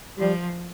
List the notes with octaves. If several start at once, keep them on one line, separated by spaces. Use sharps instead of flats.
F3 G3